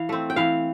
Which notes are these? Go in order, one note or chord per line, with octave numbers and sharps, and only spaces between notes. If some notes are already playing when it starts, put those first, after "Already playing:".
Already playing: E3 F5
A3 C4
G5
E3 F5